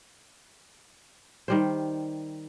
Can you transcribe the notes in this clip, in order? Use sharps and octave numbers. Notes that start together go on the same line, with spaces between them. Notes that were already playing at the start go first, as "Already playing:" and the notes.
D#3 G3 C5